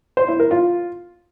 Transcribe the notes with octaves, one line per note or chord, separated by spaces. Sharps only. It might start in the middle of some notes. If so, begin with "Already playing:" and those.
C5
E4
A#4
F4